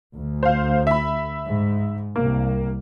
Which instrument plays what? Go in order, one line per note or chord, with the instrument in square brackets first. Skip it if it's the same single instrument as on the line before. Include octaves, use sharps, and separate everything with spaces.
[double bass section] D2
[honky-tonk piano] C5 F5
E5 B5
[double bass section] G#2
[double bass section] C2 [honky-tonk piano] A#3